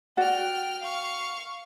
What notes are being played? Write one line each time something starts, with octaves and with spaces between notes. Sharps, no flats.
F#4 D5 F#5 G5 F6
F5 C#6